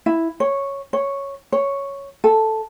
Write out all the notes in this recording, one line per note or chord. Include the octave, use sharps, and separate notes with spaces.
E4
C#5
C#5
C#5
A4